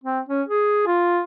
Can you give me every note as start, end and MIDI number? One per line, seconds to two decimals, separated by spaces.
0.04 0.20 60
0.29 0.42 61
0.49 0.84 68
0.87 1.21 65